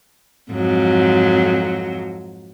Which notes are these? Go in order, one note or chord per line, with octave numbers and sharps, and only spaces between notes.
F2 G#2 F#3